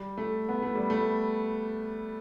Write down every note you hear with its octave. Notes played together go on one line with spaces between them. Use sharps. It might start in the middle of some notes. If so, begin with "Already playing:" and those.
Already playing: G3
A3
B3
A3
G3
A3